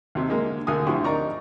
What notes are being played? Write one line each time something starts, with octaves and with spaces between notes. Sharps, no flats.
D#2 C3
D3 G#3 A#3
D2 D3 A#4 G#5 D#6
D2 F3 E4 G4 C#6
D#4 A#4 D5 A#5 C#6